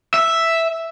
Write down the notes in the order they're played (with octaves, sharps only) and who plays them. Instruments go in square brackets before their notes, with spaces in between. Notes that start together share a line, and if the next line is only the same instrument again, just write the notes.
[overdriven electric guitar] E5